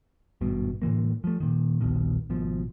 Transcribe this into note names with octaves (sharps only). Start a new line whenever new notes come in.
G#1 G2 B2
A2 D3 E3 A#3
F3 A3
A#2 D#3
D#1 A#1 B2 D#3
G#1 B2 F3